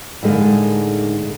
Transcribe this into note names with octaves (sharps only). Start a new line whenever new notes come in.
A2 D3 D#3 G#3 A#3